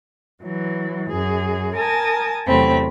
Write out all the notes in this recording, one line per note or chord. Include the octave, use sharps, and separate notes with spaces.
E3 F#3
F#2 G#4
A#4 G#5 A5 D#6 A6
E2 C3 F#3 A3 C4 B5